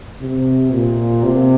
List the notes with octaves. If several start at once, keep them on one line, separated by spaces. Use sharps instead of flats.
C3
A#2
C3